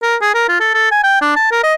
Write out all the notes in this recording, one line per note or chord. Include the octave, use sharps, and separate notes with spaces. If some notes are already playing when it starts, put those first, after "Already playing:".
A#4
G#4
A#4
F4
A4
A4
G#5
G5
D4
A5
A#4
D#5